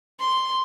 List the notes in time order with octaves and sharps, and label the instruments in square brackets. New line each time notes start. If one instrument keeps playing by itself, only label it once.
[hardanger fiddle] C6